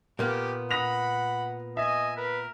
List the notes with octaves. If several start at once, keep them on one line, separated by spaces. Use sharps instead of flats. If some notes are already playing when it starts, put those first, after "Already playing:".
A#2 A#3 B3 G4
F#5 B5 D#6 A#6 F7
D#5 E5 G#5
A#4 B4